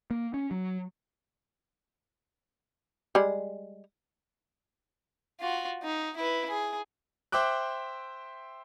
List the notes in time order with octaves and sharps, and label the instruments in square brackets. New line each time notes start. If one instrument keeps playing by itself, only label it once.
[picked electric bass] A#3
C#4
F#3
[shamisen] G3 G#3
[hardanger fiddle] F4 F#4
D#4
E4 B4
G#4
[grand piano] C5 E5 G5 D6 F#6